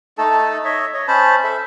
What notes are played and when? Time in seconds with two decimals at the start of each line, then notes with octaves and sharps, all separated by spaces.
0.18 A3 D#4 A4 A5
0.65 C#5 D#5 E5
0.94 C#5 D#5
1.08 C#4 C5 A5 B5
1.44 A4 E5